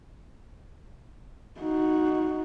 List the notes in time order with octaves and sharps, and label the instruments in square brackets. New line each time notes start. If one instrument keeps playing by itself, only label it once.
[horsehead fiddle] D#4 F#4